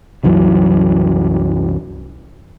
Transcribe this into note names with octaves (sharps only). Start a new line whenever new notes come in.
C2 F#2 E3 F#3